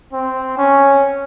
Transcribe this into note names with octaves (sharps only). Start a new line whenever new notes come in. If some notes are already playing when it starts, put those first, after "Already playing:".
C4
C#4